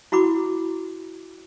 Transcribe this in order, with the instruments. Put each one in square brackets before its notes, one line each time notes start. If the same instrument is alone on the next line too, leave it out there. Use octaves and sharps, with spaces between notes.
[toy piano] E4 F#4 B5 D6